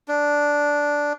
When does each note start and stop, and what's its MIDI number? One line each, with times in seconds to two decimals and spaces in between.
0.08 1.13 62